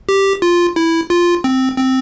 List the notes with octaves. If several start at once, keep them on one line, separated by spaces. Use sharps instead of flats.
G4
F4
E4
F4
C4
C4